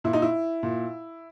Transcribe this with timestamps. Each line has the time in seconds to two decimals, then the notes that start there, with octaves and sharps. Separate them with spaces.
0.04 A#2 E4
0.13 D#4
0.22 E4
0.63 A#2